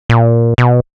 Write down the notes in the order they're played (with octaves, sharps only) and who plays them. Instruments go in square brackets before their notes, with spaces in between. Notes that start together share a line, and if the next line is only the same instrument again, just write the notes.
[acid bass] A#2
B2